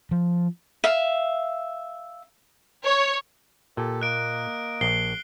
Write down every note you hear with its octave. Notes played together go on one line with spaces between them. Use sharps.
F3
E5 F5
C#5
A#2 G4 A4
A#3 D#5 F#6 D7
A#1 C7 G7